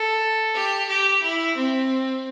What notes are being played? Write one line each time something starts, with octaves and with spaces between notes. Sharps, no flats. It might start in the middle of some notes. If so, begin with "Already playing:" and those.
Already playing: A4
G4
G4
E4
C4